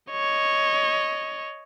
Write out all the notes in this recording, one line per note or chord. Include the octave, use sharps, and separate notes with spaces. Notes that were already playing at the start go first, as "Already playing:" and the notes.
C#5 D#5